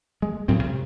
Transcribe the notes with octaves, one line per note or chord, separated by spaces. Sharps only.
G#3
D2 A2 F#3 C4
C3